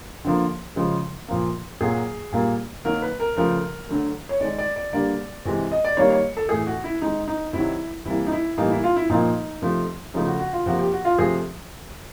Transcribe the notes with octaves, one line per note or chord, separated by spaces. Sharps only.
D3 F3 A#3
C#3 F3 G#3
A#2 F3 A#3
A#2 F#3 A#3 G#4
A#2 G3 A#3
D#3 F#3 A#3 A#4
B4
A#4
C#3 F3 A3 A#4
D3 F#3 A3
C#5
D#3 G#3 D5
D5
D5
D3 G3 A#3 D5
C3 E3 G#3
D#5
D5
D#3 G3 A#3 C#5
C#5
A4
A2 E3 A3 G#4
F#4
E4
D#3 G#3 D#4
D#4
C3 D#3 F#3 E4
C3 E3 G3 A#3 E4
D#4
E4
A2 E3 G3 A#3 D#4
E4
F4
E4
A#2 F3 A#3 D#4
C3 F3 A3
C#3 F3 A3 D#4
F#4
F#4
F4
C3 F3 A#3 F#4
G4
F#4
F4
C3 F3 A3 G#4